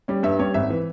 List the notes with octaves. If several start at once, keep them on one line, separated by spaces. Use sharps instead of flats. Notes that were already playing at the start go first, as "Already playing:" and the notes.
G3 C#4
G2 E5
G3 C#4 C#5
G#1 E5
E3